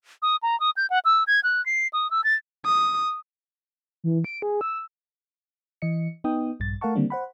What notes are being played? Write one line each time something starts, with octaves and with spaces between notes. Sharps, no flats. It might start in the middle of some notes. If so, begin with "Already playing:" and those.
D#6
A#5
D#6
G6
F#5
E6
G#6
F#6
C7
D#6
E6
A6
D#6
E3
D7
G#4
E6
E3 D#5 C#7
B3 D#4 G5 D#6
A#1 G2 A6
A3 A#4 F5 F#5 A5 C#6
D3 D#3 G3 A#3 C4 D4
C5 F#5 B5